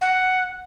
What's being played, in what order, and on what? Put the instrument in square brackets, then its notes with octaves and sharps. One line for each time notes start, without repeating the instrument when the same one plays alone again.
[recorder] F#5